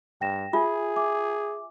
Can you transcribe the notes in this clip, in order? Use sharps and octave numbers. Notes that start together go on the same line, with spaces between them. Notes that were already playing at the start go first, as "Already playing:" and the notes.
G2 G5 A#6 E7
F4 G#4 E5 G#5
E5 G#5 D6